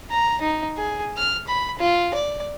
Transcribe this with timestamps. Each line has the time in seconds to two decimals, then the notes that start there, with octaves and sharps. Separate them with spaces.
0.10 A#5
0.41 D#4
0.77 G#4
1.17 F6
1.47 B5
1.79 F4
2.14 D5